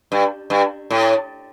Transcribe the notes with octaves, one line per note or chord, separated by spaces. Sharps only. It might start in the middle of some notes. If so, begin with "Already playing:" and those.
G2
G2
A2